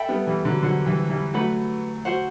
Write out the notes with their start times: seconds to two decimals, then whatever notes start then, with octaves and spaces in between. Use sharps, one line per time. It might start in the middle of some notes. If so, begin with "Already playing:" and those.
Already playing: A4 E5 G5 B5
0.08 G3 B3
0.27 E3 G3
0.44 D3 F#3
0.63 D3 F#3 F#4 C5 F#5
0.86 E3 G3
1.10 E3 G3
1.34 F#3 A3 B4 F#5 B5
2.05 F#4 C5 F#5